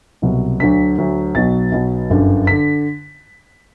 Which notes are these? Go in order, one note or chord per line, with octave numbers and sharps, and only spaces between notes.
C2 B2 F#3
D2 D3 F#3 B6
D2 D3 F#3
B1 B2 F#3 A6
B1 B2 F#3
G1 F#2 D3
D3 B6